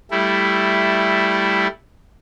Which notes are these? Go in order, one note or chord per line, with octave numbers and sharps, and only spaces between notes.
G3 A3 E4